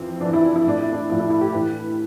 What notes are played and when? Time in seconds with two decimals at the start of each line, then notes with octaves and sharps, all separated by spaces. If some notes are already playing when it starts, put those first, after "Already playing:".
Already playing: F2 E3 C4
0.21 F2 E3 D4
0.33 E4
0.44 D4
0.56 E4
0.65 A2 F3 D4
0.80 E4
0.92 D4
1.09 A2 F3 E4
1.20 E4
1.30 E4
1.41 G4
1.53 A2 E3 B4